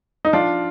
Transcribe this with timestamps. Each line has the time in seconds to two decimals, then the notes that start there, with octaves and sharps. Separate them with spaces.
0.25 D#4
0.33 F3 D4 F4